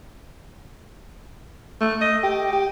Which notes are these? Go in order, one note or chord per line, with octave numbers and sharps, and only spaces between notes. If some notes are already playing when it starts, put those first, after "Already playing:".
A3
D#5
G4
G4